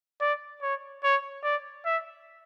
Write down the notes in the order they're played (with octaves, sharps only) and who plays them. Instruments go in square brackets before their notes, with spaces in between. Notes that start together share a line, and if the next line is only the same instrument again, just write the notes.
[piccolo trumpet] D5
C#5
C#5
D5
E5